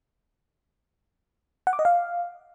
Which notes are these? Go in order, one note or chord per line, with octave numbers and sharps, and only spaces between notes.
F#5
D6
D#5
F5